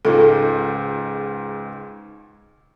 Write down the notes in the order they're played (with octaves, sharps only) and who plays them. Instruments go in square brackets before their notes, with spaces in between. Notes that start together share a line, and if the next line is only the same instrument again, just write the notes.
[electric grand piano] C#2 G#2 [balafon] F4 A4